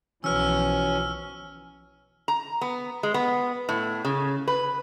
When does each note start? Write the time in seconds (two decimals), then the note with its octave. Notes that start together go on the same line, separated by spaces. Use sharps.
0.24 B1 E3 F3 C#4 F#4 B4 E6 F6
2.28 A#5
2.61 B3
3.03 G#3
3.14 B3
3.69 A2
4.05 C#3
4.48 B4